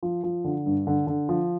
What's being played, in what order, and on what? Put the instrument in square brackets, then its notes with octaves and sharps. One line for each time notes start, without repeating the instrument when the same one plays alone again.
[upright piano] F3
F3
D3
G2
D3
D3
F3